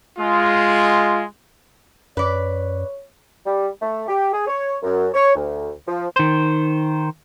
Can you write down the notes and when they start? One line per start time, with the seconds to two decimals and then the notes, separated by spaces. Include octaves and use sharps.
0.19 G#3 F4
2.17 F#2 B4 C#5 D5
3.46 G3
3.82 A3
4.08 G4
4.33 G#4
4.47 C#5
4.83 F#2
5.14 C#5
5.35 D2
5.87 F3
6.16 D#3 C5